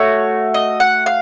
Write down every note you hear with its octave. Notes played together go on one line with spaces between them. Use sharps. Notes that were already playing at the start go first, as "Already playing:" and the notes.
Already playing: A3 F#4 C#5
D#5
F#5
F5